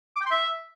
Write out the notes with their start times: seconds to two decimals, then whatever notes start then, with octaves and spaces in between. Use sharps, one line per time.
0.16 D6
0.21 G5
0.26 C6
0.31 E5